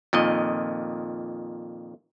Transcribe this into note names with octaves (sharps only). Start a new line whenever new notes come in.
F2 A#2 D#3 D#5